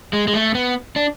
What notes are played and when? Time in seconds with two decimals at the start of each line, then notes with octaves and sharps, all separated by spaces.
0.13 G#3
0.28 G#3
0.34 A3
0.55 B3
0.96 D4